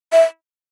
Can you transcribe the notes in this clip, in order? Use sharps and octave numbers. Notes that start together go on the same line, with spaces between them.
E5